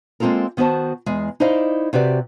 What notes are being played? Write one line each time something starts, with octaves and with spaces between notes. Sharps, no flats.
G#3 A#3 C4 F4 A4 A#4
D#3 B3 F#4 C5 A5
E2 G#3
D#4 E4 C5 D5 D#5 F5
C3 F#4 G4 B4 D5